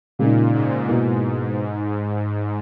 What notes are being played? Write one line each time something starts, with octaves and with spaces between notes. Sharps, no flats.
A#2 C#3 G#3 D#4
G#2
G#2 B2 A#3 E4